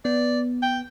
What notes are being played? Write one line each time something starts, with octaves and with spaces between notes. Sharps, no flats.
B3 D5
G5